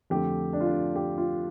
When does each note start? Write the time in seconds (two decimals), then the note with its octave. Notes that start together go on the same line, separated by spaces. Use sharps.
0.10 F2 D3 A3 G4
0.53 D4
0.61 F4
0.67 D4
0.96 G4
1.18 F4